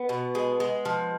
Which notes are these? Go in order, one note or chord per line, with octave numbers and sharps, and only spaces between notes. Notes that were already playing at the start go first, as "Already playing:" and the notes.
Already playing: B3
B2
G#3
G#3
F3